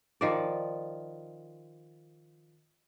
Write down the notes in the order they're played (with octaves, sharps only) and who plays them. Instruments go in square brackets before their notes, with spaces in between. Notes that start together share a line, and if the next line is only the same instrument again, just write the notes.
[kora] D#3 F3 D5